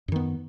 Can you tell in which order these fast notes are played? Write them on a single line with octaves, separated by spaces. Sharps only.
F#2 D#3 B3